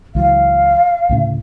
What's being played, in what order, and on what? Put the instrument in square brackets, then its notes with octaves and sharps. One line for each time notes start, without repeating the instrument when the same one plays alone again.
[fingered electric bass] C#2 E3 F#3 [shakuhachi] F5
[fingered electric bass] D2 A2 C#3